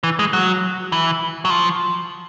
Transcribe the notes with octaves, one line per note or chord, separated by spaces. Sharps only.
E3
G#3
F#3
E3
F#3
F3